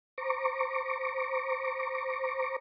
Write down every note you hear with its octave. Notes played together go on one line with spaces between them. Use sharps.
C5 A#5 C#6 D6